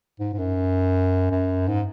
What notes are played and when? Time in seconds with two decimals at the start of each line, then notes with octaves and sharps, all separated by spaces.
0.20 G#2
0.33 G#2
0.39 F#2
1.31 F#2
1.68 G#2